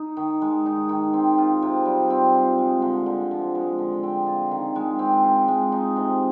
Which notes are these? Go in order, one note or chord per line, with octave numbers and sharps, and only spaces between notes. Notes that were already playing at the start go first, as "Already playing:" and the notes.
Already playing: D#4
D#3
G#3
D#4
D#3
C4
F4
C3
G3
C4
F4
G#3
D3
D3
F3
G#3
D3
C4
F4
D#3
G#3
C4
F4
G#3
D#4
C3